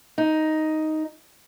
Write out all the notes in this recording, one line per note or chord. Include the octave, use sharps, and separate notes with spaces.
D#4